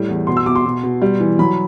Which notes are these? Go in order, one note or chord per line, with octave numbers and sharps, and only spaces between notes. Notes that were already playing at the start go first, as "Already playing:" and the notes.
Already playing: A2 G3
E2
B2 C6
E6
B2 D6
C6
B2
B2
G3
E3
F#3 B5